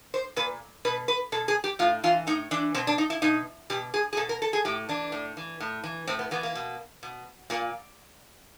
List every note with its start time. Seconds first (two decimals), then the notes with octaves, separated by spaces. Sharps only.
0.14 C5
0.36 A#2 B4
0.85 B2 B4
1.08 B4
1.32 B2 A4
1.48 G#4
1.64 G4
1.79 A2 F4
2.04 E3 F4
2.27 A2 D#4
2.51 E3 D4
2.75 B2 C4
2.87 D4
2.98 D#4
3.10 E4
3.22 B2 D#4
3.70 B2 G4
3.94 G#4
4.13 G#4
4.17 B2 A4
4.29 A#4
4.42 A4
4.53 G#4
4.65 A2 G4
4.89 E3 D4
5.12 A2
5.37 E3
5.60 A2
5.84 E3
6.07 A2 C4
6.19 B3
6.31 E3 B3
6.43 A#3
6.55 B2
7.03 B2
7.50 A#2 A#3